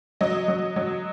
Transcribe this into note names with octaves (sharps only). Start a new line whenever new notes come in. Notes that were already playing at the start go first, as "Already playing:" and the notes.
F#3 D#5
F#3
F#3